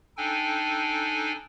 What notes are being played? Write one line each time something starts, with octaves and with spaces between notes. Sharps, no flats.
D4 D#4 A4 G5 G#5